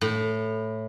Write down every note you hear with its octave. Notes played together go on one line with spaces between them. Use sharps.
A2